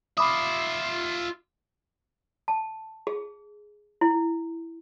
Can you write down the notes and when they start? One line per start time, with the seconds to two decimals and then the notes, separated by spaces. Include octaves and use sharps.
0.18 F4 E5 B5 D6 D#6
2.48 A5
3.07 G#4
4.01 E4